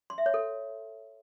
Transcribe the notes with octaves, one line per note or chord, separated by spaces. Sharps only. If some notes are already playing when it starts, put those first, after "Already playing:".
C6
E5
C#5
A4